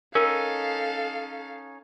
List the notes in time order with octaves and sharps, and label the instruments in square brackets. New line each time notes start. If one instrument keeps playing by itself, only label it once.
[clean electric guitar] C#4 D#4 [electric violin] A4 F5 [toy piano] A#4